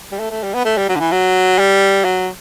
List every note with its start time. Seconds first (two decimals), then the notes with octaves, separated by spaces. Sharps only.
0.12 G3
0.19 A3
0.31 A3
0.43 G3
0.54 B3
0.65 A3
0.78 G3
0.89 F#3
0.95 D3
1.00 E3
1.12 F#3
1.59 G3
2.04 F#3